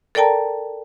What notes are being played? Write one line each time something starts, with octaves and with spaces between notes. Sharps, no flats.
A4 A#4 D5 G5 A5 A#5